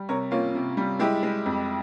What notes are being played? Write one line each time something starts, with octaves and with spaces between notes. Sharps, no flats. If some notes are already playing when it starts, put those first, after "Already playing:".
Already playing: G3
C3 A#4 C#5
A#3 C#4 F4
C3
G3
G#3 E4 G4
G#3
F2